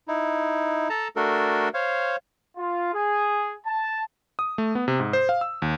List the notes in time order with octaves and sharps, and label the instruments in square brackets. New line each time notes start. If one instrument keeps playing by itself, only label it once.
[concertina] D#4 E4
A4 A5 A#5
A3 D4 F#4 A4 A#4
C5 C#5 F5
[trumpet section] F4
G#4
A5
[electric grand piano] D#6
A3
B3
C3
G#2
C5
F5
E6
D#2